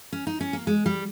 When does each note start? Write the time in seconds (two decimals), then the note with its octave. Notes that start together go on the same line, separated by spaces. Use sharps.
0.12 C#4
0.27 D#4
0.41 C#4
0.53 A#3
0.67 G#3
0.86 G3